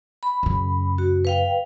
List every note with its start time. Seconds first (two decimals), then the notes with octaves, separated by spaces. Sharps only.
0.23 B5
0.43 F#2 C#3
0.98 F#4
1.25 B4 F5 G5